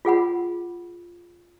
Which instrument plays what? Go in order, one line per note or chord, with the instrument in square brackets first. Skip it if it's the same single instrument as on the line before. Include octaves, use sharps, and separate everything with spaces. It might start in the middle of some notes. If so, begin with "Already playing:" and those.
[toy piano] F4 G#4 F#5 B5